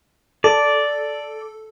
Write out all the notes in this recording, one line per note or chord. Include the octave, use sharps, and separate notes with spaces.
A4 D5